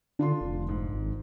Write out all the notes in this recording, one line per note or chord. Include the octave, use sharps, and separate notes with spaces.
D3 D4 F4 C6
F1
G#2
G#1